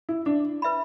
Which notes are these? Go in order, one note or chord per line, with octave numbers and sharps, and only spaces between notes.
E4
D4
B4 E5 B5